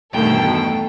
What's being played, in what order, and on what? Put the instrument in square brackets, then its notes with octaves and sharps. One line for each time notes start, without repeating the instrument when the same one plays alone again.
[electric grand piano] E2 G2 D#3 [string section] B2 A3 A4 [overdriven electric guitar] G5